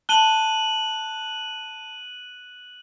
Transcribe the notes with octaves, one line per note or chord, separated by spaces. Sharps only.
A5 F#6 D#7 F#7 G7